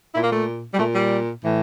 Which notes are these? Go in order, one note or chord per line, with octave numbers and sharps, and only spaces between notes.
A#2 E4
A#3
A3
G3
A#2 A3
G3
A2 E3